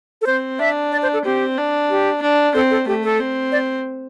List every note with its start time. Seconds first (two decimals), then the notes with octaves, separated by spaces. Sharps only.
0.22 A4
0.26 C4 C5
0.59 D4 E5
0.92 D5
1.03 C5
1.13 A4
1.24 C4 G4
1.57 D4
1.90 G4
2.22 D4
2.54 C4 A4
2.70 A4
2.87 A3 G4
3.03 A4
3.20 C4
3.52 D5